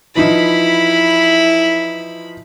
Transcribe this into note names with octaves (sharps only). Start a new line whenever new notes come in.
E3 F3 D#4 E4 B5